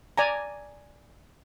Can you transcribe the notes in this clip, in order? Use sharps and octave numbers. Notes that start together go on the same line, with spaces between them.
D5 G#5 A#5